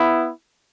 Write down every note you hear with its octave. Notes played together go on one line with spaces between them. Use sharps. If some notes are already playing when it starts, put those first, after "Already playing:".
Already playing: B3 E4